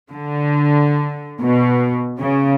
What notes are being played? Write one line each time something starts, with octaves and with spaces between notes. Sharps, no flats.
D3
B2
C#3